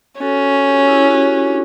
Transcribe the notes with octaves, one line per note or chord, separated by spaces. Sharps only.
C#4 F#4 A4
G4
F#4
E4 G4
F#4
E4
D4 F#4